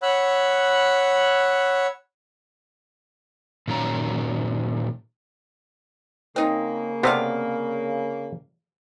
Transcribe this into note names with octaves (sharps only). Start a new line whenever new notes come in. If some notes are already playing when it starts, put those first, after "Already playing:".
C#5 F#5 B5 E6 F#6
A#2 D#3 F#3 C#4 A#5
C#3 A#3 C4 D#4
C3 B3 C4 A4 D5 F5